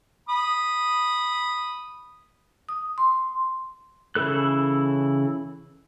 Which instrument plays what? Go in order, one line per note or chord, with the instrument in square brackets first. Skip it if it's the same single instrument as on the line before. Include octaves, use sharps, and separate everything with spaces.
[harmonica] B5 D#6
[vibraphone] D#6
C6
[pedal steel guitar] C#3 E3 E4 A4 F#6